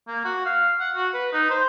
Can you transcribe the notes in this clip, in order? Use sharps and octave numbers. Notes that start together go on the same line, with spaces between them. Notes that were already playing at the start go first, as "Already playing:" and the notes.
A#3
F#4
F5
F#5
F#4
B4
D#4
C5